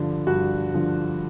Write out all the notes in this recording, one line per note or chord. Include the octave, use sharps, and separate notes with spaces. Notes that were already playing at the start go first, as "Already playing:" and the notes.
Already playing: G2 D3 F3
G2 F#4
D3 F3